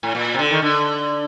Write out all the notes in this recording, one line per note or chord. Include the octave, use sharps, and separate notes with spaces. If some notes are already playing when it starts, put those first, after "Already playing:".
A2
A#2
C3
D3
D#3
D3